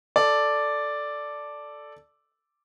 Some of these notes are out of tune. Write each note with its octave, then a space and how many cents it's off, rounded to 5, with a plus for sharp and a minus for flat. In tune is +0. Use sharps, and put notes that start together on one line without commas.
A4 +0 D5 +0